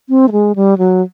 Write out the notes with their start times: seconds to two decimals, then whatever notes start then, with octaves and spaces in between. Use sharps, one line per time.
0.09 C4
0.28 A3
0.32 G#3
0.55 G3
0.78 F#3